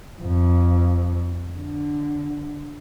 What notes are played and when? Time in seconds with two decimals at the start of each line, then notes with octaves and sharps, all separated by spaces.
0.21 F2
1.55 D3